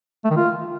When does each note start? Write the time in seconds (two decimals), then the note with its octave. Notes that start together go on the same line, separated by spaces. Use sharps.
0.25 A3
0.31 D#3
0.37 F4